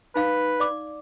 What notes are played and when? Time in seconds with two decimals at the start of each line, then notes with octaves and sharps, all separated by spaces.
0.16 D#4 B4 F5
0.60 D5 D6